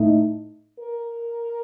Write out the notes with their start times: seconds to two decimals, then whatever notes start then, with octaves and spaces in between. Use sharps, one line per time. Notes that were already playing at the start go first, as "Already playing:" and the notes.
Already playing: A2 A3 D#4
0.79 A#4